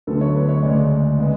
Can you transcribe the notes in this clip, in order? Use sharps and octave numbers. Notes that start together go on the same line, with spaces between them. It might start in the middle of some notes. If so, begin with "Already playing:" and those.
D2 D3 F#3 B3 D4 A4
C#5
B4
C#5
D2 C#3 G#3 D5
C#3 G#3 B3